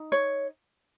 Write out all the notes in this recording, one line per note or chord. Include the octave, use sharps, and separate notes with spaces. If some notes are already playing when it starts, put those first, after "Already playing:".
Already playing: D#4
C#5